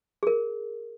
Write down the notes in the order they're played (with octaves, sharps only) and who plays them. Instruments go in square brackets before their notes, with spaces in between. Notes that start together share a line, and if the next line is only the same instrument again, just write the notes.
[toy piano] G#4 A#4